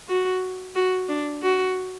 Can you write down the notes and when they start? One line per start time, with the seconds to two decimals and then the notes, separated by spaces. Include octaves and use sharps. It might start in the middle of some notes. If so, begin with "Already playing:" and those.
0.08 F#4
0.75 F#4
1.09 D4
1.42 F#4